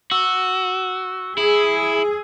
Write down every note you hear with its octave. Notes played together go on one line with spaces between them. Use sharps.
F#4 E6 G7
E4 G#4